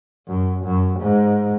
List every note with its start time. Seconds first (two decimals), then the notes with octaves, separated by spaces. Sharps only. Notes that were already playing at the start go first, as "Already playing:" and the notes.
0.27 F#2
0.64 F#2
1.00 G#2